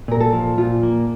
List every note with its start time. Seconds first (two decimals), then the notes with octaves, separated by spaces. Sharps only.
0.08 A#2 A#4
0.20 A4
0.33 F3
0.58 A#2 F4
0.83 A#3